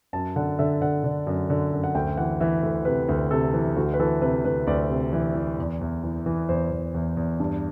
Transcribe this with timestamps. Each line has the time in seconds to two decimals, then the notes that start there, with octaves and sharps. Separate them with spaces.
0.13 F#2 A5
0.36 D3 F#5
0.59 D3 E5
0.82 D3 F#5
1.04 D3
1.27 F#2
1.50 D3
1.72 F#2
1.84 F#5
1.95 D2 G5
2.17 E3 F#5
2.40 E3 E5
2.63 D2
2.85 C3 B4
3.09 D2
3.31 C3 A4
3.53 E3
3.77 D2 F#4
3.94 B4
3.99 E3 A4
4.22 C3 B4
4.45 D2 B4
4.67 D2 D5
4.90 C3
5.13 E3
5.35 E3
5.58 E2
5.81 E2
6.04 E3
6.26 E3
6.49 E2 C5
6.71 E2
6.94 E2
7.17 E2
7.40 G2